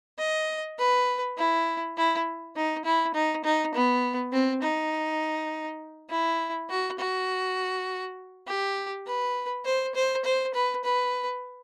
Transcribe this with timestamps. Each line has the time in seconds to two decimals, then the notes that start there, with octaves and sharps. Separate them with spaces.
0.19 D#5
0.79 B4
1.38 E4
1.97 E4
2.56 D#4
2.85 E4
3.14 D#4
3.44 D#4
3.75 B3
4.33 C4
4.63 D#4
6.10 E4
6.70 F#4
6.99 F#4
8.48 G4
9.07 B4
9.65 C5
9.95 C5
10.25 C5
10.54 B4
10.84 B4